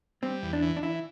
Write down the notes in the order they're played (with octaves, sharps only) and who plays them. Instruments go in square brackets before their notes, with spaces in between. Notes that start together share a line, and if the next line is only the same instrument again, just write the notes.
[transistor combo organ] G3 [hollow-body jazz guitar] C4
[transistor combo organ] E2
[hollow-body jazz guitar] D4
[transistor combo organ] E3
[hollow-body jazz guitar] D4
[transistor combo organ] E3 [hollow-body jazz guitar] E4